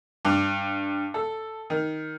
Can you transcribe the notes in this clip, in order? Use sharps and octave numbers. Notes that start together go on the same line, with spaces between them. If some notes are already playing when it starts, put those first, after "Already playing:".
G2
A4
D#3